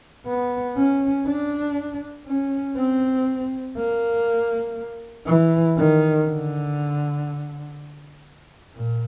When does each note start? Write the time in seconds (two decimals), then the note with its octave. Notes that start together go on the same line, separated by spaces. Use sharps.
0.27 B3
0.77 C#4
1.27 D4
2.27 C#4
2.77 C4
3.77 A#3
5.26 E3
5.77 D#3
6.26 D3
8.76 A#2